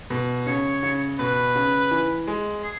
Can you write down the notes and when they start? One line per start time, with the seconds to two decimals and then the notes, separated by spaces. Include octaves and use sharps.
0.10 B2
0.46 C#3 C#5
0.83 C#3
1.19 B2 B4
1.56 C#3
1.91 E3
2.27 G#3
2.64 G#4